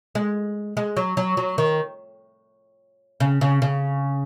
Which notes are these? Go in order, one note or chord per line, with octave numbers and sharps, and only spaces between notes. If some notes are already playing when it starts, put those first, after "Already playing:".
G#3
G#3
F#3
F#3
F#3
D#3
C#3
C#3
C#3